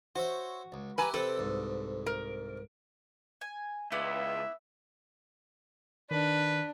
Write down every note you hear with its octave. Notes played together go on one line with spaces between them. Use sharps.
F#4 C5 C#5 E5
C#2
E4 G4 B4 G#5 A#5
C3 C4 A4 B4 G5
C2 G#2
A#4
G#5
C#2 B3 E4 D5 E5
D#3 D4 B4